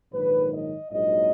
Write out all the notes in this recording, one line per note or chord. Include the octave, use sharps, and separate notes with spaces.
A#1 G#2 D#3 F#3 B4
D#5
A#1 G#2 F#3 D#5